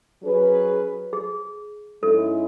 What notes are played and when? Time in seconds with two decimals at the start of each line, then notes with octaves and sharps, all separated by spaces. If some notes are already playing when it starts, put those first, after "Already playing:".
0.23 F#3 C#4 G#4 B4
1.13 G#4
2.03 G#2 G#3 C#4 E4 A4